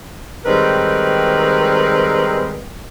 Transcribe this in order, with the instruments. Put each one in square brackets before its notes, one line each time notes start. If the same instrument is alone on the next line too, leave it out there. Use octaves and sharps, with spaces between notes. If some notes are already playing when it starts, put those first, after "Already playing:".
[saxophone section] D#3 G3 G#3 C4 A#4 B4